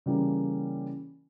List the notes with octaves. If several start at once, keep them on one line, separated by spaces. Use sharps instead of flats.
C#3 E3 G3 A#3 C#4